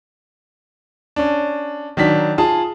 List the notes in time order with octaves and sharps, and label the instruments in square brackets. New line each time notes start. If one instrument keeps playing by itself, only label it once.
[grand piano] C#4 D4
D#3 F#3 D4 B6
F4 G#4 A5